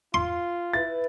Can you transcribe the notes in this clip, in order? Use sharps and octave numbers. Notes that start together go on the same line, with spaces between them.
F4 C6
E4 B4 A6